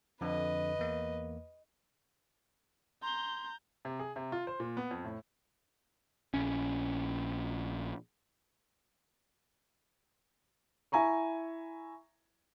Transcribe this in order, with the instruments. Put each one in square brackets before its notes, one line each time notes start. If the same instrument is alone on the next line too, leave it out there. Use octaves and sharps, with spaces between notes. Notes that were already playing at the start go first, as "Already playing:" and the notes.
[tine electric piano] F2 D3 [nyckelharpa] B4 D#5
[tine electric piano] E2 A#3
[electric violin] A#5 G6 [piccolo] C6
[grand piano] C3
G#4
C3
F4
C5
A#2
B3
F2
A2
[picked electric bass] A#1 C#4
[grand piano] E4 E5 G#5 A#5 C#6